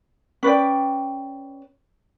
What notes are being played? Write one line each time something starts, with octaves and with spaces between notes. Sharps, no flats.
C#4 B4 D5 G5